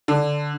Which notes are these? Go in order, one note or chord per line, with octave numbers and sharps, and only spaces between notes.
D3